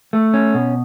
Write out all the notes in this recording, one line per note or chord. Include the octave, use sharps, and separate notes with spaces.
A3
C#4
B2